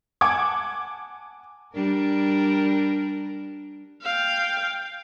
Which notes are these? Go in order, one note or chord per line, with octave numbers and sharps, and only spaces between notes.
F#5 G#5 A5 D6 G#6
G3 D4 A#4
F5 G5